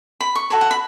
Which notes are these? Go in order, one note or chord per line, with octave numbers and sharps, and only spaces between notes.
B5
C#6
F#4 A4 C#5 B5
F#5
B5